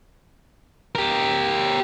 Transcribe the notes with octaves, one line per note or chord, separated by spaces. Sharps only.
G4 A#4